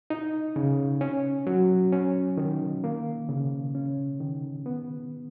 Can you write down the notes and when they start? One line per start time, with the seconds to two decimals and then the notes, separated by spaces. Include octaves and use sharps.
0.10 D#4
0.56 C#3
1.01 C#4
1.47 F#3
1.92 C#4
2.37 D#3
2.84 A#3
3.29 C#3
3.75 C#4
4.20 D#3
4.66 B3